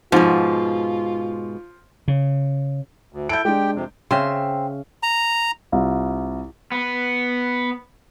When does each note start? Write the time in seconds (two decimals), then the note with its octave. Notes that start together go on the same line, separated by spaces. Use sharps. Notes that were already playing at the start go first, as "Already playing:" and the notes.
0.12 G#2 B2 F3 F4
2.08 C#3
3.12 D2
3.29 E4 A4 G6 D7
3.45 G#3 D4 G4 G5
3.75 F2 C3
4.11 C#3 C4 E5 C6
5.03 A#5
5.72 C2 F4
6.72 B3